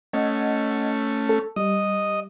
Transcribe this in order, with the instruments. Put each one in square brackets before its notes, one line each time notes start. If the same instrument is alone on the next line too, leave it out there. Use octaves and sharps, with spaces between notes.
[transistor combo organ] A3 C#4 [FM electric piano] D#5 F#5 G#6
[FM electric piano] A4
[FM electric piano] G3 [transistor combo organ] D#5